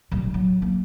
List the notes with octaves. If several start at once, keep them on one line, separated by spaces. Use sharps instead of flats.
D1 G3
F#3
A#3